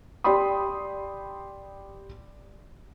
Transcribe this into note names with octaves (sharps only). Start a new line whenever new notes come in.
G4 D5 G5 B5 C6 D#6